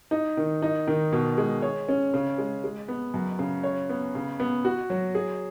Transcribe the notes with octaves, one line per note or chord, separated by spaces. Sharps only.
D#4
D#3
D#4
D#3
B2
G#3
C#5
C#4
C#3
G#3
G#3
B3
F#2
C#3
C#5
B3
C#3
B3
F#4
F#3
G#4